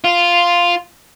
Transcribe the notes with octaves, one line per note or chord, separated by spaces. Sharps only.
F4